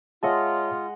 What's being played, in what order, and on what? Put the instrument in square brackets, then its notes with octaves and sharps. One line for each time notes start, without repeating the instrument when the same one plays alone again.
[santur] G#3 D#5 F#5 [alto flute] F4 [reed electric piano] C#5 E5 A5